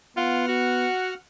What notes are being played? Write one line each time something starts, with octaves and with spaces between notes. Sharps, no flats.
B3 F4 F#5 F6
F#4